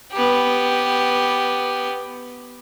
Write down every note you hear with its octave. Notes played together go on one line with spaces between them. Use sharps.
B3 G4